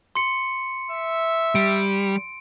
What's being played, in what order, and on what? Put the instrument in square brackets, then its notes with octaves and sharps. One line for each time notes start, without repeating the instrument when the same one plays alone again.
[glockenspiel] C6 C#7
[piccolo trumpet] E5
[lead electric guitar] G3 [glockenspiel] D7